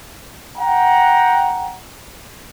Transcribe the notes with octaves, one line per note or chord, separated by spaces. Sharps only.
F#5 G5 A#5